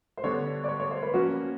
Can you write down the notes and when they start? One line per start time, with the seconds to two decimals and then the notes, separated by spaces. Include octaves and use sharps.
0.17 C5
0.24 D3 G3 B3 D4 C#5
0.64 D5
0.69 C#5
0.80 C#5
0.91 C5
1.02 B4
1.14 F3 A#3 C#4 F#4